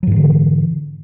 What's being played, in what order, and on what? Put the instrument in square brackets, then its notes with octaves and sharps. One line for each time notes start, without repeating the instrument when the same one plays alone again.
[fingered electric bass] F#3
G#2
E3
D3